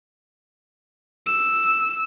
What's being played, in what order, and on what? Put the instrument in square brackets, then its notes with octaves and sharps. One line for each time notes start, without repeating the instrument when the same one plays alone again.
[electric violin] E6